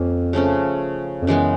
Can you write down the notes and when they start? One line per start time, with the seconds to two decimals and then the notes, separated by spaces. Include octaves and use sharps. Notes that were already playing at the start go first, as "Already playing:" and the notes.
Already playing: F2 F3 A#3 C#4
0.33 C#3 F3 A3 C#4
1.22 F2
1.27 F#2 C#3 E3 G#3 B3